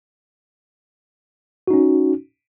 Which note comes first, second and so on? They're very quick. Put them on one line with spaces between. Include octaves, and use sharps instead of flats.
F#4 D#4 C#4